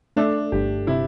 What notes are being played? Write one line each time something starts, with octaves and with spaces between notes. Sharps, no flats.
A3 D4
G1 G4
C3 E4